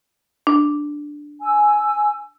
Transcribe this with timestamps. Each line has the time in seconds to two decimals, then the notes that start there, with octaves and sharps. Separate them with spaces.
0.47 D4
1.42 G#5 E6